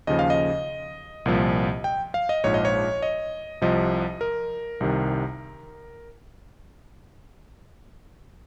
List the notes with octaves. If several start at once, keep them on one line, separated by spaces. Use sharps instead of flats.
D#2 C#3 F3 D#5
F5
D#5
C2 A#2 F3
G5
F5
D#5
A#1 G#2 F3 C#5
D#5
C#5
D#5
C2 C3 F3 D#5
A#4
C2 C3 D#3